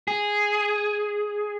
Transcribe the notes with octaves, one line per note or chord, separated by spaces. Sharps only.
G#4